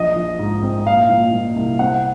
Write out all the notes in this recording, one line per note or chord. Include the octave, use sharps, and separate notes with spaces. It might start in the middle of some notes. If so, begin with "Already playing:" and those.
Already playing: A#1 D#5
F3
G#2
C4
A#2 F5
A#2
A#2
C2
C4 F#5